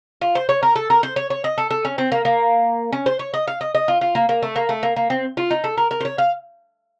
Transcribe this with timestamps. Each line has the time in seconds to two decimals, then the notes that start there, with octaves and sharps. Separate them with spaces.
0.21 F4
0.35 C5
0.49 C#5
0.63 A#4
0.76 A4
0.90 A#4
1.03 C5
1.16 C#5
1.30 C#5
1.44 D#5
1.58 A4
1.70 A4
1.85 C#4
1.98 C4
2.12 A#3
2.25 A#3
2.92 C#4
3.06 C5
3.19 C#5
3.34 D#5
3.47 F5
3.61 D#5
3.75 D#5
3.88 F4
4.01 F4
4.15 A#3
4.29 A#3
4.42 A3
4.56 A#3
4.69 A3
4.83 A#3
4.96 A#3
5.10 C4
5.37 F4
5.51 D#4
5.64 A4
5.78 A#4
5.91 A#4
6.00 C5
6.05 C#5
6.18 F5